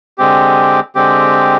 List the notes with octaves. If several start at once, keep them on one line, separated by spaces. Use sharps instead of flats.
D3 G#3 C4 G4
D3 G#3 C4 G4